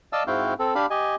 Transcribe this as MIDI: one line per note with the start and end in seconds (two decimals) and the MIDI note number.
0.13 0.23 74
0.13 0.23 75
0.13 0.23 77
0.13 0.23 81
0.13 0.23 88
0.27 0.54 44
0.27 0.54 60
0.27 0.54 64
0.27 0.54 66
0.27 0.54 77
0.27 0.54 79
0.59 0.74 60
0.59 0.74 69
0.75 0.86 62
0.75 0.86 67
0.75 0.86 77
0.75 0.86 83
0.90 1.15 67
0.90 1.15 75
0.90 1.15 80